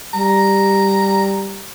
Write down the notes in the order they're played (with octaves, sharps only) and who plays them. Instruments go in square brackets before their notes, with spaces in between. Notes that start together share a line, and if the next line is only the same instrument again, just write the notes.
[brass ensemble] G3 [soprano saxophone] A#5